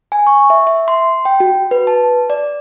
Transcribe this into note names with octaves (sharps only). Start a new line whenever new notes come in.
G#5
C#6
E5
E5
C6
G5
F#4
B4
A5
D5